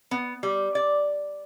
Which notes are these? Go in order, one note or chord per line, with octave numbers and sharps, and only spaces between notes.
B3
G3
D5